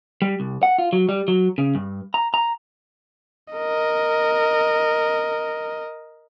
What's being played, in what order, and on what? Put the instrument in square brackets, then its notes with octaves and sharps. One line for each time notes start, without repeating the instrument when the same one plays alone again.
[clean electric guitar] G3
C2
F#5
F4
F#3
G3
F#3
C#3
G2
A#5
A#5
[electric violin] A#4 D#5